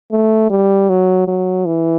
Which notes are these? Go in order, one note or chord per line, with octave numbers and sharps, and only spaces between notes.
A3
G3
F#3
F#3
E3